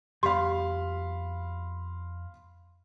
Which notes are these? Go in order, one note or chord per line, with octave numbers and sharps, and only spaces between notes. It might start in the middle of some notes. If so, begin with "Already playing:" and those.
F2 G3 B3 G4 F5 B5 C6